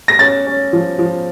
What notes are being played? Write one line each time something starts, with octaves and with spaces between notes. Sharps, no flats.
A#6
C#4 A6
C#4
F3
F3